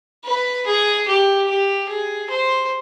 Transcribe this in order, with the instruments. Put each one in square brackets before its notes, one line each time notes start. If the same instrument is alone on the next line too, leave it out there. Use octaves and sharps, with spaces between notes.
[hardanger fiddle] B4
G#4
G4
G4
G#4
C5